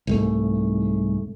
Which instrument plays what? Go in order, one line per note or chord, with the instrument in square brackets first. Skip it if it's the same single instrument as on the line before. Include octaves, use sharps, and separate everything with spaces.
[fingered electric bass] C2 G#2 A3